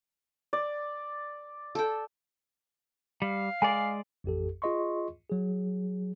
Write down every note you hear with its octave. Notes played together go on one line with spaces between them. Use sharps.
D5
A4 G5
G3 F5
G#3 D5 G#5
A1 F2 G4 A4
F4 G#4 D#5 C6 C#6
F#3 G#4